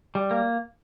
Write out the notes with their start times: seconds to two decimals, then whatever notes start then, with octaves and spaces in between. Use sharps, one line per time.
0.15 G3
0.31 A#3